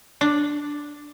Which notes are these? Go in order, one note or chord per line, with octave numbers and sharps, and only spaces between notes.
D4